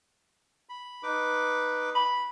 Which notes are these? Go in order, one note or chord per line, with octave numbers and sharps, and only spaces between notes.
B5
D#4 B4 D6
B5